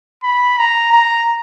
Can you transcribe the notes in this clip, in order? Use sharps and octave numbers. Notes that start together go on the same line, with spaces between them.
B5
A#5
A#5